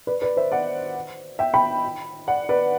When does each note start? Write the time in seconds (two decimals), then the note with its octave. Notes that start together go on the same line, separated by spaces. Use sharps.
0.07 B4 D5
0.22 B4 D5
0.37 C5 E5
0.52 D5 F#5
1.39 E5 G5
1.54 G5 B5
2.28 D5 F#5
2.49 B4 D5